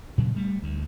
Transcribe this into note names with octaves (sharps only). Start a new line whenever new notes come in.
A#2 C#3 F#3
G3 A3
D2